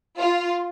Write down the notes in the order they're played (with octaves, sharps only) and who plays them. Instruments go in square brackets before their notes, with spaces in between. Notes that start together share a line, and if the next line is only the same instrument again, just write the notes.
[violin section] F4